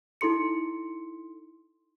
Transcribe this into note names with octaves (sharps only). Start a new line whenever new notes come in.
D#4 E4 A4 C6 C#7